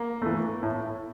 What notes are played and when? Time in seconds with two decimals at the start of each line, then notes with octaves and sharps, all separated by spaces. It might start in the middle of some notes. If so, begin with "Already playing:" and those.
Already playing: A#3
0.22 E3 A3
0.63 A2